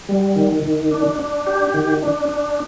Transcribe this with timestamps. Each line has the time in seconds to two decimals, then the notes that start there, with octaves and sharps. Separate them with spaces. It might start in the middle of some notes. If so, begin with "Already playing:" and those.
0.09 G3
0.36 D#3
0.63 D#3
0.91 D4
1.19 D4
1.47 G4
1.74 D#3
2.02 D4
2.29 D4